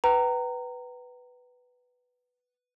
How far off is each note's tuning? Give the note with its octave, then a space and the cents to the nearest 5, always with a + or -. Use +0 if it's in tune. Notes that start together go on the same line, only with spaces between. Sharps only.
B4 +0 G5 -40 A#5 -15